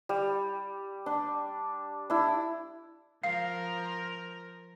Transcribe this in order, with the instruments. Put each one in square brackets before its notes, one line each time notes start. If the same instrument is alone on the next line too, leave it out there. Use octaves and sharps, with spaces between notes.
[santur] G3
D4
D4 E4
[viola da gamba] F3 A#4 [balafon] F5